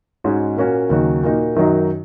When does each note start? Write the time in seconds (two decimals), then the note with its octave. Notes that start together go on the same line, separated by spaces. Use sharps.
0.24 G#2 G#3 C#4 F#4
0.56 A#2 A#3 C#4 F#4
0.90 D#2 C#3 F#3 D#4 F#4
1.23 A#2 A#3 D#4 F#4
1.56 F#2 D#3 F#3 D#4 F#4